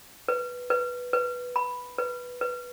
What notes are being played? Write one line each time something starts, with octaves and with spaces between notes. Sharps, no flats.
B4
B4
B4
B5
B4
B4